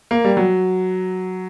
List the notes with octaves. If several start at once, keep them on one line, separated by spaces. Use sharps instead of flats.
A#3
G3
F#3